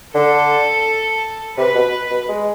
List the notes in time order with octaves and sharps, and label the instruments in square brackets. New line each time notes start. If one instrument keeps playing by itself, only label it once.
[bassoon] D3 [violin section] A4
[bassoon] C3 [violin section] B4
[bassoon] B2
B2
G#3